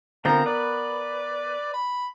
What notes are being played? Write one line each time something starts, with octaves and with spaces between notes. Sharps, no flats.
D3 B3 C4 F4 A#4 A#5
B4 D5
B5